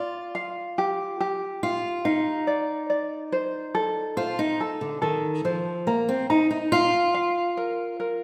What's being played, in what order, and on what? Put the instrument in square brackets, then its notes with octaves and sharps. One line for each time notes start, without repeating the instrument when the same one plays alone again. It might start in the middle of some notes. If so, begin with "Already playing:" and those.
Already playing: [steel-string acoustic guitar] F4 [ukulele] D5
[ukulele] F5
G4
G4
[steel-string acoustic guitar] F4 [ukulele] F5
[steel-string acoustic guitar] D#4 [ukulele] F5
[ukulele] D5
D5
C5
A4
[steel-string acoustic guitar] F4 [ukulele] C5
[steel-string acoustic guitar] D#4
[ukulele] A4
[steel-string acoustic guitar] D3
[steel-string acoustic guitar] D#3 [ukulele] A4
[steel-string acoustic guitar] F3 [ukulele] C5
[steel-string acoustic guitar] A#3 [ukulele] A#5
[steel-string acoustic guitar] C4
[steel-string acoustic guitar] D#4 [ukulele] A#5
[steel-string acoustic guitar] D#4
[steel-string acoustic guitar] F4 [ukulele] F5
[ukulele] F5
A#4
A#4